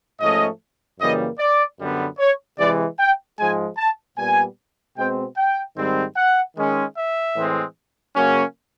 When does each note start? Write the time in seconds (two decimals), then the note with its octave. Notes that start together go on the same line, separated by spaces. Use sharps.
0.21 G#2 F3 A3 C#4 D#5
0.99 F#2 C#3 E3 G3 A#3 D#5
1.39 D5
1.79 F#2 D3 G3 B3
2.19 C#5
2.58 C3 E3 G#3 D5
2.99 G5
3.39 G#2 F3 G#3 G#5
3.77 A5
4.18 A#2 G3 B3 G#5
4.97 B2 G#3 C4 G5
5.37 G5
5.77 G#2 D#3 G3 C4
6.16 F#5
6.56 D#3 G#3 C#4
6.96 E5
7.36 A2 E3 G#3 C4
8.16 C#3 F#3 A#3 C#4